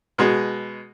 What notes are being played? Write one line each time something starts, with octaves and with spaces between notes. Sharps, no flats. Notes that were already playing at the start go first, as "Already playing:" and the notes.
B2 G#3